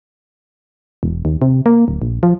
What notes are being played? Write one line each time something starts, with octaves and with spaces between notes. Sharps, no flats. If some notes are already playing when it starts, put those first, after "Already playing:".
E1
D#2
C3
A#3
D1
A#1
F3